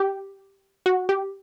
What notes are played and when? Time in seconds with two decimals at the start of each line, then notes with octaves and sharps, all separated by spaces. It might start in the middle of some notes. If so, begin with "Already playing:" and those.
Already playing: G4
0.86 F#4
1.09 G4